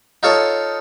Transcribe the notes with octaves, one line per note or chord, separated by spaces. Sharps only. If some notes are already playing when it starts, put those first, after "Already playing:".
D#4 F4 A4 C#5